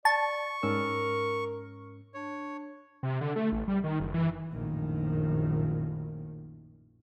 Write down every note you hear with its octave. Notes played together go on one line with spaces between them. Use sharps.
D5 A5 C#6
G#2 C#4 A#4 E6
D4 C#5
C3
D3
A3
A1
G3
D#3
F#1
E3
A#1 F#2 A2 D#3